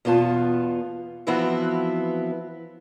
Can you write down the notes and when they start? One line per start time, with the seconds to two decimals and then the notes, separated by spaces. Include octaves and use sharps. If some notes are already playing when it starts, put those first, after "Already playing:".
0.05 E2 B2 B3 F4 A5
1.27 E3 F3 B3 C4 E4 F#4